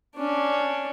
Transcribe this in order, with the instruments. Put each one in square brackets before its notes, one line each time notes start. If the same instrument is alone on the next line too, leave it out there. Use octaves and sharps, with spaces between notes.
[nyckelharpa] C#4 D4